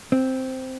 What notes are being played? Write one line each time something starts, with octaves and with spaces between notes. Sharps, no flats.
C4